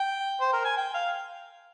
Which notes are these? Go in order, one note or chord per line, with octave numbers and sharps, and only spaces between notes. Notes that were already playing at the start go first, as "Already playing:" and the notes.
Already playing: G5
C5
A#4
G#5
G5
F5